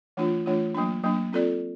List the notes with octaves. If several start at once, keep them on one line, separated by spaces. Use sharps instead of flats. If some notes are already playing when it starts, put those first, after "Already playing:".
E3 A3 D4 F4
E3 A3 D4 F4
F#3 A#3 D4
F#3 A#3 D4
C4 F4 A4 D5